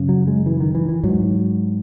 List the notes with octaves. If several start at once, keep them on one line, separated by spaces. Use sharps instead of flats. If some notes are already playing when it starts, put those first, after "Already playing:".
Already playing: F#2 C#3
F#3
G#3
E3
D#3
E3
E3
G#2 F#3